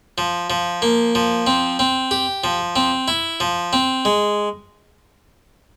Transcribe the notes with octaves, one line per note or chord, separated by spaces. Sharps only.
F3
F3
A#3
F3
C4
C4
G4
F3
C4
E4
F3
C4
G#3